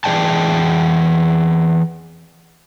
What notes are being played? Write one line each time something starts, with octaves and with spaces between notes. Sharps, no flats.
E3 G#4 D5 G5 A5